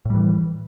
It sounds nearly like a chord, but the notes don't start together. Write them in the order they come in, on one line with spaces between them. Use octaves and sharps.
A2 G3 E3